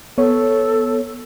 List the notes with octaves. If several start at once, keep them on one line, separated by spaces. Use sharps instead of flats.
B3 A4 C#5